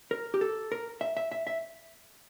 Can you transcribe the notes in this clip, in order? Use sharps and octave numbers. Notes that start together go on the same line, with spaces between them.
A#4
G4
A4
A#4
E5
E5
E5
E5